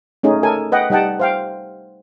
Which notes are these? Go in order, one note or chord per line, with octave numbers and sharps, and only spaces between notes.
A3 C#4 D#4 G#4
A4 A#4 G#5
B4 D#5 F#5 G5
G3 D#4 D#5 F#5 G5 A5
C5 F5 G5